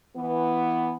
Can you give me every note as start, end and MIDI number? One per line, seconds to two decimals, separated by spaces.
0.17 0.95 52
0.17 0.95 59